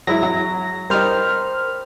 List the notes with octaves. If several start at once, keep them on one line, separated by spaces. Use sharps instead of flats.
F#3 G#3 E4 A#6
F#3
G3 D#4 A#4 C5 F6